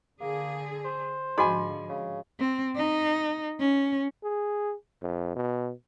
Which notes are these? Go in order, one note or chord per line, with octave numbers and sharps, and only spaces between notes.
D3 A#3 G#4
C5
G#2 D3 F3 F#4 G#4 D#5 G#5 B5
C#3
C4
D#4
C#4
G#4
F2
B2